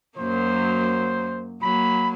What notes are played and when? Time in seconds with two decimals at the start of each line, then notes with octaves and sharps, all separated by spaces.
0.18 F#2 F#3 A#3 C5
1.62 F#3 A#3 B5